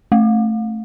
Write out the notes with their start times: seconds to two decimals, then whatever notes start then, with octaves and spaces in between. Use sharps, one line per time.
0.12 A3